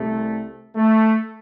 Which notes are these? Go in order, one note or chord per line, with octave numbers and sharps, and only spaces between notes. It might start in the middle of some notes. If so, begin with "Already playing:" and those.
Already playing: C2 C3 G3 A3
A3